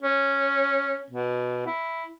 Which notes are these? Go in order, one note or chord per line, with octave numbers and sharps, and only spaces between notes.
C#4
B2
E4